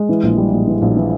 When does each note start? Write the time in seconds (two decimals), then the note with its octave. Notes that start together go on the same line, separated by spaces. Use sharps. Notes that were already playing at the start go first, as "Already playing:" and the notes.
Already playing: G#3
0.09 E3
0.23 A#1
0.37 G3
0.52 A#1
0.67 E3
0.82 A#1
0.96 E3